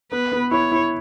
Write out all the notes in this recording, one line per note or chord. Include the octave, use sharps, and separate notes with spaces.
B3 B4
B3
E4 C#5
E4